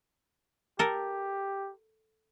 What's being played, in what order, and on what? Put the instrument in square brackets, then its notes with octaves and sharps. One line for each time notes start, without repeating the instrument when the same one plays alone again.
[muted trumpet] G4 [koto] A4 A#4